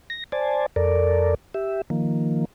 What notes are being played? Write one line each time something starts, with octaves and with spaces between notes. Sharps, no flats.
A#6
C5 D5 G#5 A5
F2 A4 A#4 D5
G4 E5
D#3 F3 A#3